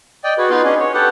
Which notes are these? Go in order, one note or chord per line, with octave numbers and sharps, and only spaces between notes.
D5 D#5 G5
F#4 G#4 B4
B3 D#4 F4 B4 F5 C6
C#4 D4 G#4 D#5
C#5
G4 A4 B4 F#5